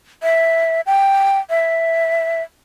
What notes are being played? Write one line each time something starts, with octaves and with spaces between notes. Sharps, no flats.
E5
G5
E5